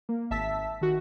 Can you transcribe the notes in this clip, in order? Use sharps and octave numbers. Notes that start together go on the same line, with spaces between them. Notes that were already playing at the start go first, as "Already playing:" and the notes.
A#3
G#1 E5 A5 E6 B6
D#3 F#4